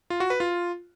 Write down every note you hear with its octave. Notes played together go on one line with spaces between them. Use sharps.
F4
F#4
B4
F4